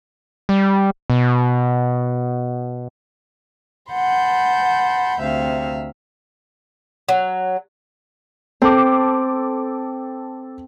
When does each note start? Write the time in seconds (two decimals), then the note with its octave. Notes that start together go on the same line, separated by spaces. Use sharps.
0.49 G3
1.10 B2
3.93 F#5 A5 B5 C6 G6
5.20 D2 C3 E5 F5
7.09 F#3
8.62 C4 A4 D6